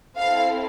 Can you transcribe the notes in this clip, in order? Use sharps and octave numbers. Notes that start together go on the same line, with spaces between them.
C4 E4 A4 F5